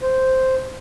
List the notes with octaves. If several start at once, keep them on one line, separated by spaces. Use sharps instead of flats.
C5